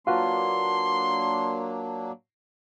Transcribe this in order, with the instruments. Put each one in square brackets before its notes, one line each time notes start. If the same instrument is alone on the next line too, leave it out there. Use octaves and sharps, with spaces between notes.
[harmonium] F#3 A#3 D4 [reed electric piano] F4 F#4 B4 [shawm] C6